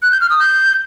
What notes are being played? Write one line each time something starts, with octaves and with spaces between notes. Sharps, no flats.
F#6
G6
F6
D#6
G6